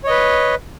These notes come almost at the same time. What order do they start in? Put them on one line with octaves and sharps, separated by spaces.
C#5 D#5 B4